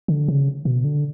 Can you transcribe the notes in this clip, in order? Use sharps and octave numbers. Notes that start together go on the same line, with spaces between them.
D3
C#3
B2
D3